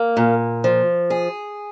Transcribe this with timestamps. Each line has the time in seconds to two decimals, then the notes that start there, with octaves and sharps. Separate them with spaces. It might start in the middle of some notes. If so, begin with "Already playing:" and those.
Already playing: A#3
0.17 A#2
0.64 F3
1.10 G#4